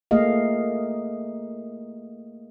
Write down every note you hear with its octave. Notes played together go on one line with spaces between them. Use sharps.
A3 A#3 G#4 D#5 F5